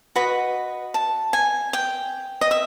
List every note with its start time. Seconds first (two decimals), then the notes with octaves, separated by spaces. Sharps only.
0.16 F#4 B4 D#5 B5
0.94 A5
1.33 G#5
1.73 G5
2.41 D#5
2.51 E5